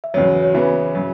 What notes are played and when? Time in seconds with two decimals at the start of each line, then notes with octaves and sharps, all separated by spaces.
0.04 E5
0.14 E2 C#3 F#3 C#5
0.24 C#5
0.34 B4
0.44 C#5
0.54 C#3 E3 B3 E4 E5
0.95 C#3 F#3